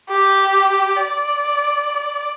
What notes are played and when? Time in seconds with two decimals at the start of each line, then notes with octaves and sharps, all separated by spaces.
0.10 G4
0.96 D5